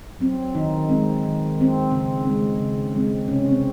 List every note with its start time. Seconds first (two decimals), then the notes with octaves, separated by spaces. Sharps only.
0.20 F#3 C4
0.55 D#3 D#4
0.89 G#3 C4
1.23 D#3
1.57 G#3 C4
1.92 C#3 C4
2.25 G#3 C4
2.59 C#3
2.94 G#3 C4
3.28 C3 C#4
3.51 C4